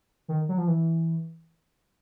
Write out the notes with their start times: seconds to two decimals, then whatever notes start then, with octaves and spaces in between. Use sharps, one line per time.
0.28 D#3
0.49 F#3
0.58 F3
0.67 E3